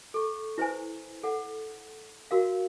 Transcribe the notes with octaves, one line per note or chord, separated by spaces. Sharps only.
A4 C#6
E4 B4 C5 G#5
A4 F#5
F#4 A#4 F5